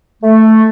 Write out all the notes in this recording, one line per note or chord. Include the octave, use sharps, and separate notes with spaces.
A3